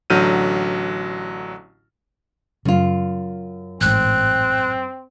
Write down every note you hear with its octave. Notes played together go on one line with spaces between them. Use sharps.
A1 D3 F#3 F6 G6 D#7
F#2 C#3 F4
A1 G#2 C4 F#6